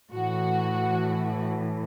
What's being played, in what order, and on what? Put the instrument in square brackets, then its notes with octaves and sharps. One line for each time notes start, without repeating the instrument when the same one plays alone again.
[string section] A2 E3 F#4